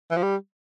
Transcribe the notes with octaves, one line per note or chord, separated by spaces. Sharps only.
E3
F3
G3